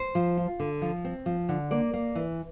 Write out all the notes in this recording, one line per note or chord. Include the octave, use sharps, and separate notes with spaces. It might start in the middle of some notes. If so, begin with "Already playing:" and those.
Already playing: C5
F3
F4
D3
F3
C4
F3
D3
A#3 D5
A#3
E3